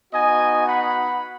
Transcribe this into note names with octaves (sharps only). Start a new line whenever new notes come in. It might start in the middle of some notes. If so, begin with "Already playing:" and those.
B3 D#4 F#4 D#5 G#5
F#5 B5